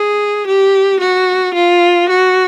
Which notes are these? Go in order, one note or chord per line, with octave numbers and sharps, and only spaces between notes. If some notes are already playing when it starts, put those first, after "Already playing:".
Already playing: G#4
G4
F#4
F4
F#4